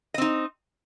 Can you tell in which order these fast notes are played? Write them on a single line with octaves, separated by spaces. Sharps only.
D#5 C4 D#4